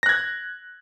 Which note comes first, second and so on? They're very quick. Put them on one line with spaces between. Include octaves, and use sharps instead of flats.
A#6 F#6 G#6